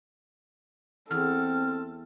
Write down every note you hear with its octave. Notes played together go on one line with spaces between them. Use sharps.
E2 C4 A4 F6